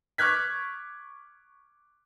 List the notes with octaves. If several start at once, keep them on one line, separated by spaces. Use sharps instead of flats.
C#6 D6 F6 F#6 G#6 B6